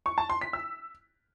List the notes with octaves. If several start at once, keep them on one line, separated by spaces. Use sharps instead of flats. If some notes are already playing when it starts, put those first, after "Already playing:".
C#6
A5
C6
B6
E6